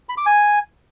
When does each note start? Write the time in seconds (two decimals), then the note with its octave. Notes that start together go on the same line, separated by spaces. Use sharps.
0.09 B5
0.18 D6
0.26 G#5